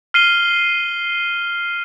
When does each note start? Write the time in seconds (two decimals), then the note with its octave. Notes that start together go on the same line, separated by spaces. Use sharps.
0.14 F6 C7 D#7 G7